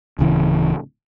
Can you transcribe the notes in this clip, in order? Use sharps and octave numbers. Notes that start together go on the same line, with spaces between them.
D1 C#3 E3